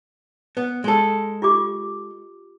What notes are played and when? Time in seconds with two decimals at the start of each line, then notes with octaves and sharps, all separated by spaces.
0.57 B3
0.84 G#3 A4
1.42 F4 G4 D6